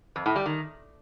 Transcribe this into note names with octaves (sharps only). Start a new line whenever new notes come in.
F2
A2
G3
D#3